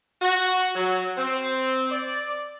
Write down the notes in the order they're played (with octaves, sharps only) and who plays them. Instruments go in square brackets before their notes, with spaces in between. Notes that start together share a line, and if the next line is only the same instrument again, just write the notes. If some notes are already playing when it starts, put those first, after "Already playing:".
[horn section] F#4
F#3
C4
D5